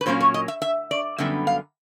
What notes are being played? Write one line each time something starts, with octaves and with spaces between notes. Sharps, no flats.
B4
A#2 F#3 A#3 C#4 C5
C#5
D#5
E5
E5
D5
F#2 D3 G3 B3 E5
F5